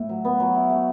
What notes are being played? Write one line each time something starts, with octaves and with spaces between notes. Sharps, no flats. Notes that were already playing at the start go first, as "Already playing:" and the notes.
Already playing: A2
F#3
B3
F#3
E4
A3